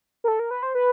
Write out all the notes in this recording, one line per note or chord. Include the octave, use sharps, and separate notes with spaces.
A#4
A4
A#4
B4
C5
B4